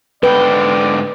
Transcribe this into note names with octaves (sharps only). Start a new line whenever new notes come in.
G#2 D3 B4 D5 G5